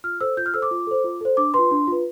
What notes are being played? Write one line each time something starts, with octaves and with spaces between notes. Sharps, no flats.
F4 F6
A4 C5 E6
F4 G6
F6
A4 C5 E6
D6
F4
A4 C5
F4
A4 C5
D4 D6
F4 B4 C6
D4
F4 B4